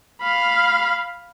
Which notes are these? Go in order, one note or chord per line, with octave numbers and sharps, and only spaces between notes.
F5 B5